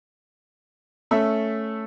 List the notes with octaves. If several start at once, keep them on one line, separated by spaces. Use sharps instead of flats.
A3 C#4 E5